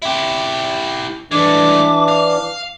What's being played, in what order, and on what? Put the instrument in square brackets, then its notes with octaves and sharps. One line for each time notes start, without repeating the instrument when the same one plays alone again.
[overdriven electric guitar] E4 G4
[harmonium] E3 D4 [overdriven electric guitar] G#3 A3 [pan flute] D6
[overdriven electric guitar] F5